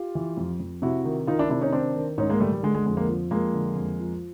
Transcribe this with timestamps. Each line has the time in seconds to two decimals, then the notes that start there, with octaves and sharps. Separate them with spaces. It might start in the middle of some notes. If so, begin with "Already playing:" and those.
Already playing: F4 G4
0.15 E3
0.37 F2
0.60 F2
0.82 C3 E4 F#4
1.05 D#3
1.27 D#3 D#4 F4
1.39 D4 E4
1.50 C3 D4 E4
1.61 C#4 D#4
1.72 D#3 C4 D4
1.96 D#3
2.18 G#2 C#4 D#4
2.30 G#3 A#3
2.40 D#3 G3 A3
2.52 G3
2.63 D3 G#3
2.75 G#3
2.86 F2 G#3
2.97 G#3 A#3
3.08 F3
3.31 F2 G#3 A#3
3.54 D3
3.76 F2
4.00 F3